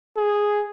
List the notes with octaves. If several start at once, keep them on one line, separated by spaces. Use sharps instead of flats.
G#4